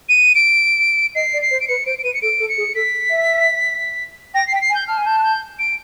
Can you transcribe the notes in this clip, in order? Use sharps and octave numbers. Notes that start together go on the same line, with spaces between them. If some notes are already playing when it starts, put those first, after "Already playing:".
D#7
D7
D#5 C7
D5
C7
C5
D7
B4 C#7
C5 D7
D7
B4 D#7
C#7
A4 D7
A4
C#7
G#4
A4 B6
E5
G5 A#6
C7
G5
B6
C7
G#5
G6
A5 F6
G#5
A5 G6
F#6
G6
D7